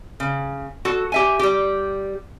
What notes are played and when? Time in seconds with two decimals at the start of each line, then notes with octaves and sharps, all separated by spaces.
0.20 C#3
0.85 F#4 A4
1.12 G4 E5 G#5
1.39 G3 G4